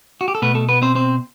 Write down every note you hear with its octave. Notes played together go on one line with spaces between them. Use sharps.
F#4
G4
A4
B2 A3 B3 B4
A3 A4
B3 B4
C4 C5
C4 C5